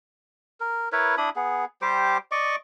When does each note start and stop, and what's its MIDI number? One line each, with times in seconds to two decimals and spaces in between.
0.60 0.89 70
0.92 1.15 64
0.92 1.15 70
0.92 1.15 71
0.92 1.15 73
1.18 1.30 62
1.18 1.30 64
1.18 1.30 83
1.18 1.30 87
1.36 1.65 59
1.36 1.65 68
1.82 2.18 55
1.82 2.18 67
1.82 2.18 72
1.82 2.18 86
2.32 2.56 74
2.32 2.56 75
2.32 2.56 85
2.32 2.56 86